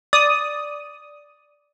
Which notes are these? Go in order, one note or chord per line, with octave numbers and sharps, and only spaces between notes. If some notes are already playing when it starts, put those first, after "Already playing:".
D5 D#6